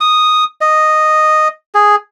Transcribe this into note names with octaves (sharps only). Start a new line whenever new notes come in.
D#6
D#5
G#4